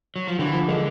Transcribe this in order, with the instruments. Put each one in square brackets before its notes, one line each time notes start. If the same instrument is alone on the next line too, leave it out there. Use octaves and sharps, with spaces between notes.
[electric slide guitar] F#3
F3
[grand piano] D3 [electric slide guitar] E3
[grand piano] F3
[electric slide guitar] D3 [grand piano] G#3